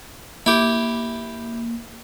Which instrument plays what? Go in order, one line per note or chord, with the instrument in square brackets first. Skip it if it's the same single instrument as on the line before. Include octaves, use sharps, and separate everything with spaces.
[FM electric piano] A#3 [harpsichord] E4 G4